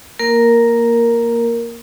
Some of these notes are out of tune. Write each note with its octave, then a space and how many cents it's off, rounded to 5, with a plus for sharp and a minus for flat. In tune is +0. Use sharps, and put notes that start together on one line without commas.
A#3 +0 A#4 +0